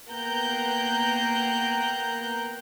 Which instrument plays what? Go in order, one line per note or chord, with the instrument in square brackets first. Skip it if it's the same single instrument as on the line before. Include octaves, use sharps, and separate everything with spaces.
[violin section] A#3 B3 G5 A#5 F#6 G6